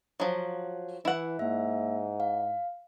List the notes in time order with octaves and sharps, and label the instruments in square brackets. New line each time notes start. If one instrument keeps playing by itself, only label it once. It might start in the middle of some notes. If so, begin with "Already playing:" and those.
[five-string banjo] F3 F#3
[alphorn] E3 [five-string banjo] E4 F#5
[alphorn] G#2 [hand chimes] A#3 E5
[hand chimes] F5